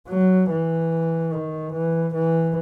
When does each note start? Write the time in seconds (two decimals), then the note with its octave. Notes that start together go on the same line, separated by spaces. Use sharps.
0.08 F#3
0.50 E3
1.32 D#3
1.73 E3
2.14 E3